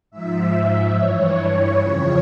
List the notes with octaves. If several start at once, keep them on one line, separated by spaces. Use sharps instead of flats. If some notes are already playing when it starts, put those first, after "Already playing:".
G#2 F3 E5
E5
E5
G2 E3 C#5
F2 C#3 F3